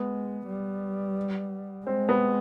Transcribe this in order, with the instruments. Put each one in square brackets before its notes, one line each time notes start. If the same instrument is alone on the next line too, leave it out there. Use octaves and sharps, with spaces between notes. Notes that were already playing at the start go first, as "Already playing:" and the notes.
Already playing: [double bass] G#3 [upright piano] B3
[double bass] G3
[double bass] G#3 [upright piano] C4
[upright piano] B3